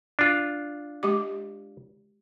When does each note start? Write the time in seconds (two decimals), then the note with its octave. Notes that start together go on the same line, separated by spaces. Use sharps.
0.19 D4 F4
1.03 G#3 G4 D6